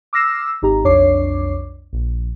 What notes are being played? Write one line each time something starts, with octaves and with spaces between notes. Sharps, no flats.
D6 E6 F6 A#6 C7 E7
G#1 D#4 G4 A#5
B1 F2 D4 C#5 D6 C7
A#1